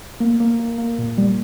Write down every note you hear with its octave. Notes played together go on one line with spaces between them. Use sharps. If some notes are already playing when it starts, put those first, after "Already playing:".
A#3
A#3
A#3
A#3
A#2
G3